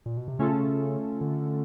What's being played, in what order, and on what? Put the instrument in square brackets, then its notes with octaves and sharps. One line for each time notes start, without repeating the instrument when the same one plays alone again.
[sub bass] A#2
B2
C3
[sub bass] C#3 [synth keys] A3 C#4 F4 A4
[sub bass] D3